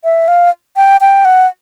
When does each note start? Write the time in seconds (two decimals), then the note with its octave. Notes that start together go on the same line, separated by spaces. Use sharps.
0.04 E5
0.28 F5
0.77 G5
1.01 G5
1.25 F#5